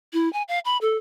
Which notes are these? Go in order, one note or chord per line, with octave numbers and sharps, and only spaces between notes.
E4
G#5
F5
B5
A4